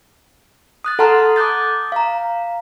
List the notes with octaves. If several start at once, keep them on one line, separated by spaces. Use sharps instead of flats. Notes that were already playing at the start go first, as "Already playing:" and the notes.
D#6 F#6 A6
A4 F#5 A5 A#5 C6 F6
D6 D#6 F#6 G6 A6
F5 A#5